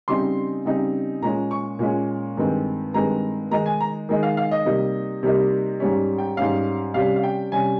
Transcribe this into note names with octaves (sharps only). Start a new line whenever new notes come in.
C#3 G3 C4 D#4 C6
C#3 G3 C4 D#4
A#2 G#3 C#4 A#5
C#6
A#2 G#3 C#4
G2 D#3 G#3 C4
G2 D#3 G#3 C4 A#5
D#3 G#3 D#4 A#5
G#5
A#5
D#3 G#3 D#4
F5
F5
D#5
C3 G3 A#3 D#4
C3 G3 A#3 D#4
G#2 G3 C#4
G5
G#2 G3 C#4 F5
C3 G3 C#4 F5
F5
G5
C3 G3 C#4 G#5